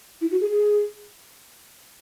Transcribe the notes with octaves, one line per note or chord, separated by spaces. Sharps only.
E4
F#4
G#4
G#4